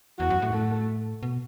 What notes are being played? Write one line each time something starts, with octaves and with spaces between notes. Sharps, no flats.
E2 F#4
F#2
A2
A3
B2